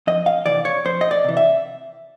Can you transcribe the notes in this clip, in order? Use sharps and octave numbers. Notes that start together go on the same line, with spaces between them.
F2 D#5
F5
C3 E3 D5
C#5
F2 C5
D#5
D5
C3 E3
E5